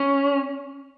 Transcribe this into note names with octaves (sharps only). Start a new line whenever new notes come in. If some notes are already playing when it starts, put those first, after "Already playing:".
Already playing: C#4